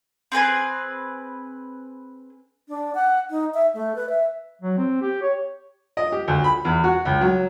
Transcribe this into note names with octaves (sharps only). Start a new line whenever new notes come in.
C4 G#4 B4 G#5
D4
F#5
D#4
E5
A3
B4
E5
F#3
C4
G4
C#5
D#5
G4
D2
B5
E2
F#4
C#2
F#3